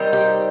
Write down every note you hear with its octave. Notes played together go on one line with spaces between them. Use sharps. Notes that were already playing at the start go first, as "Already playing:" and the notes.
Already playing: D#3 G3 C4 D#4
G4